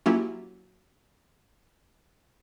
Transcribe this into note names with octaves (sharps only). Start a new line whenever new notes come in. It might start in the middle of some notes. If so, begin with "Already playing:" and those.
F#3 A#3 C#4 E4 F4 G4